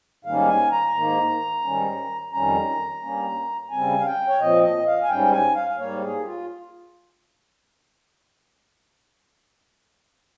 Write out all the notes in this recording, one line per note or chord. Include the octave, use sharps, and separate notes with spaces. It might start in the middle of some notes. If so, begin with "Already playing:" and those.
G#2 D#3 G3 A#3 C#4 F5
G#5
A#5
G#2 D#3 A#3
G#2 D#3 G3 C#4
F2 D#3 G3 C#4 A#5
G2 G3 A#3 C#4
C#3 G3 C4 G#5
F5
G5
C#5
A#2 F3 C4 D#5
D#5
F5
G#5
G#2 G3 C#4 G5
G#5
F5
G#2 G3 A#3 C#5
G#4
G4
F4